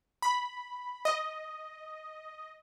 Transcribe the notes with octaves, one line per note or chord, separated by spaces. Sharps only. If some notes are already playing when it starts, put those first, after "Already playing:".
B5
D#5